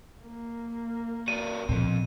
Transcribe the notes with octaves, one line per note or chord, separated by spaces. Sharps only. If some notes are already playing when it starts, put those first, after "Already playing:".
A#3
F#4 A#4 D5 D#7
A#1 B2 F3 C4